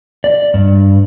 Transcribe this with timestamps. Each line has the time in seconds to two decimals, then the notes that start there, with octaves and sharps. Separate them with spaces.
0.24 D5
0.54 G2